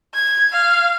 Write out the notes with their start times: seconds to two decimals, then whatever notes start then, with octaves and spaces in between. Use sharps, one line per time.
0.15 G#6
0.53 F5